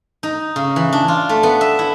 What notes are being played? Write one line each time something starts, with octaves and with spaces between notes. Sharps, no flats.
D#4
C#3
E3
D4
F4
A3
B3
E5
E4